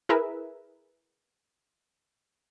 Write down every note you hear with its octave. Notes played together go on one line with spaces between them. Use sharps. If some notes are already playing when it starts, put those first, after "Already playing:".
E4 G#4 A#4 B4 E5